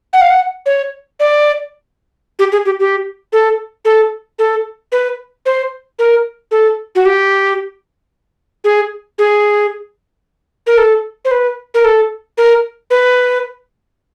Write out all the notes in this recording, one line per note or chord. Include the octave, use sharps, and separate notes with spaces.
F#5
F5
F#5
C#5
D5
G4
G#4
G4
G4
A4
A4
A4
B4
C5
A#4
A4
F#4
G4
G#4
G#4
A#4
A4
C5
B4
A#4
A4
A#4
B4